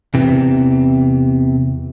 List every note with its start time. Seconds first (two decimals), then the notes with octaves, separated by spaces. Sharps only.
0.14 E2 C3 E3